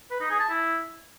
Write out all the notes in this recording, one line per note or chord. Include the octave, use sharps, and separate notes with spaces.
B4
D#4
G#4
A5
E4